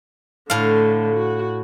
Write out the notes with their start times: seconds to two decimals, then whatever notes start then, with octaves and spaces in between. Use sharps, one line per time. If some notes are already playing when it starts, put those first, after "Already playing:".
0.50 A2 D3 A3 F5
1.15 F#4